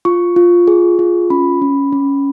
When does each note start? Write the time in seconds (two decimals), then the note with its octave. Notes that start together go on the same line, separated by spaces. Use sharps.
0.05 F4 C#6
0.36 F4
0.68 G#4
0.99 F4
1.30 C#4 B5
1.62 C#4
1.93 C#4